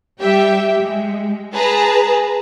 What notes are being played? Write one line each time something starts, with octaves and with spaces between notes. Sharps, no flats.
G3 G4 E5 G5
G#3
G#4 B4 A5 A#5